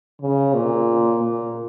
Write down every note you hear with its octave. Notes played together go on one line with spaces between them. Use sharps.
C#3
A#2
A#2